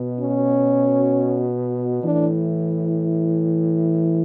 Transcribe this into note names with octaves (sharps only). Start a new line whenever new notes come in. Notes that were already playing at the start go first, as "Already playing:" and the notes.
Already playing: B2
C#4
A2 E3 D4